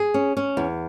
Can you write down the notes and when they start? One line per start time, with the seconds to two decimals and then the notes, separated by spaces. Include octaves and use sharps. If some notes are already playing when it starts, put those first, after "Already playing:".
Already playing: G#4
0.14 C#4
0.37 C#4
0.57 E2